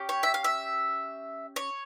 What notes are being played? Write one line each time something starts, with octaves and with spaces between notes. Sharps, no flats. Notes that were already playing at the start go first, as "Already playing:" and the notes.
Already playing: C#4 G4
C#5
E5
F5
E5
C#5